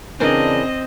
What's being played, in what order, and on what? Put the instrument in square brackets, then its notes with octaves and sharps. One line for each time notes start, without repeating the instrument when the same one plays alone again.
[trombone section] C#3 D4 [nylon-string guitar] E3 G#4 A#4 [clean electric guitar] C4 [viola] D#5